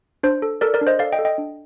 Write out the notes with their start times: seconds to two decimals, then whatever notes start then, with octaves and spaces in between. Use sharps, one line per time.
0.23 D4 C5
0.42 A4
0.61 A4 A#4 D5
0.74 A#4 D5
0.81 D4
0.87 C5 D#5
0.99 A4 D5 F5
1.12 D#5 G5
1.19 A4
1.25 D#5 G5
1.38 D4